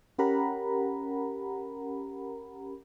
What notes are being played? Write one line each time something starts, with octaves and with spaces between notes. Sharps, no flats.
C#4 G4 A#4 F#5 A#5 B5